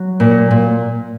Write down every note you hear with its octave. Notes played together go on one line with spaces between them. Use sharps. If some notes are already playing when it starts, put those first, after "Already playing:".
Already playing: F#3
A#2
A#2